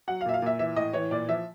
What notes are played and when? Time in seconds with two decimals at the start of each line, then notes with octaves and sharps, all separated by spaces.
0.08 F#3 F#5
0.21 F5
0.25 A#2 E5
0.34 F5
0.42 A#2 E5
0.59 E3 E5
0.76 A2 D#5
0.93 E3 C#5
1.11 A#2 D5
1.29 F3 E5